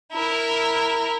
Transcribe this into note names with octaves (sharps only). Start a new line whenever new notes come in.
E4 A#4